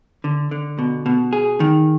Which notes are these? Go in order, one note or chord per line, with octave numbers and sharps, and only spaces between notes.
D3
D3
B2
B2
G#4
D#3